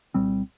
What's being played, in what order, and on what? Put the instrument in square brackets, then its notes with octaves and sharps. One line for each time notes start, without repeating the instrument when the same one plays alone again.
[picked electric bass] C2 A#2 G3 C4